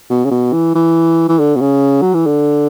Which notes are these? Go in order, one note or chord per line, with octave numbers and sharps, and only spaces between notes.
B2
C#3
B2
E3
E3
E3
D3
B2
C#3
F#3
E3
D3